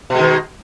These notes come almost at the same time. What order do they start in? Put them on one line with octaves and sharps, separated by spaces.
B2 G#3 D#3